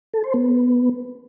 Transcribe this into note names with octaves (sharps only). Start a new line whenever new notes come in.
A4
C5
B3